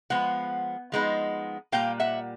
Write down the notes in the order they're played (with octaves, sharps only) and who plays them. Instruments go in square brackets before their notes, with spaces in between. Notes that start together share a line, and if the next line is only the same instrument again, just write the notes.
[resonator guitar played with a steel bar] F3 G#3 B3 F#5
F3 G#3 B3 D#4
A#2 G3 A#3 F5 G5
E5 F#5